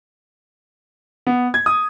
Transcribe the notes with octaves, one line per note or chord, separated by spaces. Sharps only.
B3
G#6
D#6